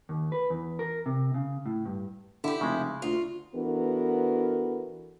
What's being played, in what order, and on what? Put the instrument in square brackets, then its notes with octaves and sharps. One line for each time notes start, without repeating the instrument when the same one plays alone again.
[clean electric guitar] D#2
B4
E2
A#4
C3
C#3
A2
G2
[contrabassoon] D3 [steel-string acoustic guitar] E4 G4
[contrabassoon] F1 [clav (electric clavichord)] C#3 G#3
[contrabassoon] D2 [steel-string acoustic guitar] F4 F#4
[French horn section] E3 B3 D4 F#4 A4 A#4